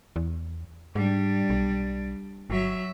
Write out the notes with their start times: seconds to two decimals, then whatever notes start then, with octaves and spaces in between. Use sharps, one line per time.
0.16 E2
0.95 G#2 G3 D4
1.50 B1
2.50 G1 F#3 E5